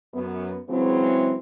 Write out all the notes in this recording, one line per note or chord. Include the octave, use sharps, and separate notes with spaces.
F#2 B3
C#3 E3 F#3 G#3 C4